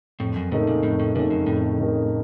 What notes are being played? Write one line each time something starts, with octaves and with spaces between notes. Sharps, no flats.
F2 A2
F#2
A2 C#3 A3 D#4 A#4
A#2
F2 A2
A2
A#2 C#3 A3 D#4 A#4
F#2
F2 A2
C#3 A3 D#4 A#4